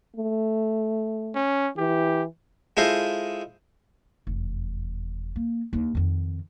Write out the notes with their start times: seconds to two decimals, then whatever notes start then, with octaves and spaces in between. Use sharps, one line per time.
0.16 A3
1.35 C#4
1.78 E3 G4
2.77 G#3 E4 F4 A4 C5 D#5
4.27 F1 E2
5.36 A#3
5.73 D#2 D4
5.95 F2 D#3